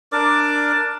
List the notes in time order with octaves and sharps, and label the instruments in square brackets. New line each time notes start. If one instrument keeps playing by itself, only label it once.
[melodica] D4 A#4 D5 D6